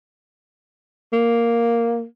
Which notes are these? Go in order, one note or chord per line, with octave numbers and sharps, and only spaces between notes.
A#3